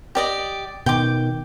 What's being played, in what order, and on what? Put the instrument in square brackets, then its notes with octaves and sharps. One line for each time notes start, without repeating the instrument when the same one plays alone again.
[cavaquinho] G4 D5 D#5
[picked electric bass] B2 D#3 [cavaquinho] G5 D6